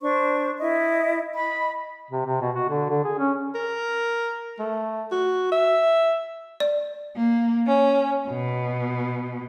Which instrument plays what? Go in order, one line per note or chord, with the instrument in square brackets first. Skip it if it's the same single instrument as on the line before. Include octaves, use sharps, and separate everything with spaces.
[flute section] D4 C5 C#6
E4 D#5
D#5 B5
[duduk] C3
C3
B2
F#4
D3
D3
G#4
C#4
[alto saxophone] A#4
A3
F#4
E5
[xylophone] D5
[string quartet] A#3
C#4
B2